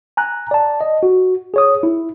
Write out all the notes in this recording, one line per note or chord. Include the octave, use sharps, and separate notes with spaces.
G#5 A#5 F#6
D5 A5
D#5
F#4
G#4 C#5 D#6
E4